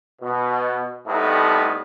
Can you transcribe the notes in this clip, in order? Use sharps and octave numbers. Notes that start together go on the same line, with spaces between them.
B2
A2 G3 A3 B3 C4 D#4